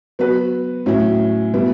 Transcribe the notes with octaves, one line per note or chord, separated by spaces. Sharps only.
F#3 B3 F#4 B4
A2 F#3 C#4 E4
B2 G3 B3 E4